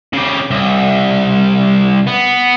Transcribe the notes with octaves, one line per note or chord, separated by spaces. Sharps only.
C#3 G4
C2
B3